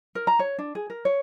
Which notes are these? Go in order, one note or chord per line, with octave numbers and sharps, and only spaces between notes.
A#4
A#5
C#5
D4
G#4
A#4
C#5